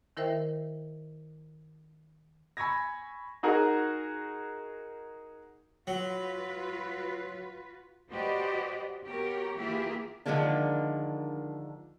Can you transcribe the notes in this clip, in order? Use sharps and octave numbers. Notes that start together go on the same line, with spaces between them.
D#3 E4 A#4 C5 E5 G5
G#5 B5 C#6 E6 G#6 A#6
D#4 F#4 G#4 A#4 F#5
F#3 F4 F#4 B4
F#4 G4 B4 C5 D5 D#5
B3 F#4 G4 A#4 C#5
E3 A#3 F4 G4 G#4 E5
D3 D#3 F3 G#3 A#3 D4